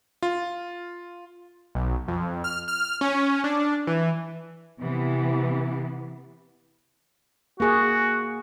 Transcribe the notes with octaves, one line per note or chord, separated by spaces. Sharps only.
F4
B1
F2
F6
F6
C#4
D4
E3
C3 E3 B3
A#3 F#4 G#4